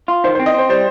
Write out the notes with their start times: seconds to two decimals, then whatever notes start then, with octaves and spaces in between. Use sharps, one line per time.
0.08 F4
0.24 D#3 C5
0.35 C4 C5
0.46 D#5
0.54 C4 C5
0.69 G3 C5